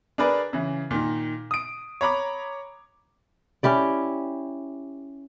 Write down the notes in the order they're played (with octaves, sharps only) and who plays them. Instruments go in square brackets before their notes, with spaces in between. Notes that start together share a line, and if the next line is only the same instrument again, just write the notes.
[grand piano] D4 G#4 A#4 B4 D5
C#3 E3
A#2 D#3
D#6 D7
C#5 A#5 B5 D6
[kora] C#4 E4 G4 D5